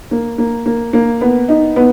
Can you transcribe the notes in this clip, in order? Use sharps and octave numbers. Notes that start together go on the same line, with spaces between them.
A#3
A#3
A#3
A#3
B3
D#4
B3